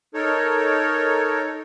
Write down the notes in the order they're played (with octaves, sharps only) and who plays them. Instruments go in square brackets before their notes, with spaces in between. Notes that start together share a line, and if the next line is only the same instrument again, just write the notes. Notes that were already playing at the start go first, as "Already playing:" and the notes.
[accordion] D#4 A4 A#4 C#5